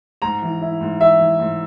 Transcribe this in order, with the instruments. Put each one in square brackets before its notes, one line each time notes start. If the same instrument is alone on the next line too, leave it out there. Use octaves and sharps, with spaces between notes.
[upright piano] G#2 [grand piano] A#5
[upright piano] E3
E4
G#2
[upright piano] E3 [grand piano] E5
[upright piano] E3
G#2